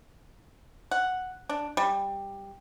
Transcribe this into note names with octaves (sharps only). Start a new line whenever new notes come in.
F#5
D4
G3